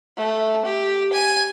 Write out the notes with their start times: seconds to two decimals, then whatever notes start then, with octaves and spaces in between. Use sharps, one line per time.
0.17 A3
0.65 G4
1.13 G#5